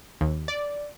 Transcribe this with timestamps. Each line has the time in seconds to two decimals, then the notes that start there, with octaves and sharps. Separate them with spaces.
0.21 D#2
0.48 D5